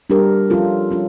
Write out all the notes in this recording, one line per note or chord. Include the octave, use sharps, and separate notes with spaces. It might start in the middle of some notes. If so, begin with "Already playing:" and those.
G3 D4 G4 A#4
F3 C#4 F4 A4
G3 C#4 F4